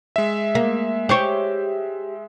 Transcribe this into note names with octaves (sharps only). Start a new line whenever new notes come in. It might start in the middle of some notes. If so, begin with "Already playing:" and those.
G#3 E5
A#3
G4 C5 C#5